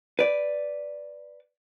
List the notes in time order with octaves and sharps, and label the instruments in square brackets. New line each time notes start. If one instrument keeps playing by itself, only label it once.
[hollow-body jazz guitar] B4 D5